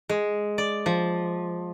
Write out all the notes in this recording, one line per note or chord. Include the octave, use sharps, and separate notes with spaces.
G#3
D5
F3